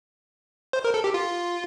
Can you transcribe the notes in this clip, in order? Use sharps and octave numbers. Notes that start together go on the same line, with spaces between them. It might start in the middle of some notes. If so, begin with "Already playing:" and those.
C5
A#4
A4
G4
F4